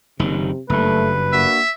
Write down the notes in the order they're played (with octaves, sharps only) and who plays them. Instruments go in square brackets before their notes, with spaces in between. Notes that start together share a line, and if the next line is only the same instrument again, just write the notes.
[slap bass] F#1 D#3 [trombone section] C3
[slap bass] F#1 G2 [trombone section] A3 [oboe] B4
[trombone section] A#3 D4 F#4 [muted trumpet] E5